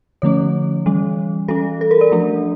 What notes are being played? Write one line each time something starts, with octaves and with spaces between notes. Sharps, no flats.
D3 F3 A3 C#4 C#5
E3 G3 C#4
E3 G3 C#4 A4
A4
A#4
D5
F3 A3 D4